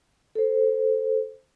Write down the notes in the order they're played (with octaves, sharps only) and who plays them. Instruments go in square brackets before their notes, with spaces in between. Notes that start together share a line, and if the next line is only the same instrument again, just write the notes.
[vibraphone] A4 C5